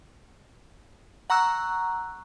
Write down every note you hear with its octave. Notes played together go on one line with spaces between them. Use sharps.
F#5 A#5 C#6 E6 F#6